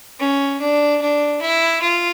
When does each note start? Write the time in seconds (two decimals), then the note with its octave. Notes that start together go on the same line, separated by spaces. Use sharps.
0.19 C#4
0.60 D4
1.01 D4
1.41 E4
1.82 F4